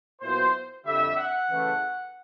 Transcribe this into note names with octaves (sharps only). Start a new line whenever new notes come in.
A#2 F#3 B3 E4 C5
F2 D3 G3 E5
F#5
C#3 E3 A3